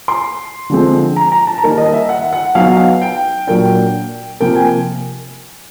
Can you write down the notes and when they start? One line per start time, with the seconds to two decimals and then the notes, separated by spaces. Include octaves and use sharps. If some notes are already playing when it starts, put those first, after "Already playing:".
0.08 C6
0.70 D3 F3 G#3 C4
1.16 A#5
1.32 A#5
1.47 A5
1.58 A#5
1.63 D#3 G3 A#3 D#4 A5
1.78 D#5
1.93 E5
2.09 F#5
2.33 F#5
2.55 F#3 B3 D#4 F5
2.66 F#5
2.77 F5
3.01 G5
3.47 A#2 F#3 A#3 D4 G5
4.40 C3 F3 A#3 G5
4.56 G#5